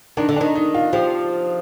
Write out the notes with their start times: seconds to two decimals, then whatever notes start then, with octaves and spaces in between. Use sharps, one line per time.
0.17 D#3 D4
0.29 D3
0.36 D#3 D4
0.55 D#4
0.74 F4
0.93 F3 G4